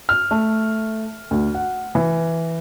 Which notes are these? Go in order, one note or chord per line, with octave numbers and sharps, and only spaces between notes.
F6
A3
D2
F#5
E3